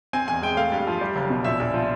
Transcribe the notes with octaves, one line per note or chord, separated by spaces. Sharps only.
C4 G#5
E2 G#5
G#3 G5
A3 F5
G2
F3
G3
F#1
B2
A#1 E5
A#1
F3